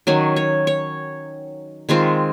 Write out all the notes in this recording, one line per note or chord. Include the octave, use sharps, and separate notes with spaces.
D#3 F#3 C#4
C#5
C#5
D#3 G#3 C4 F4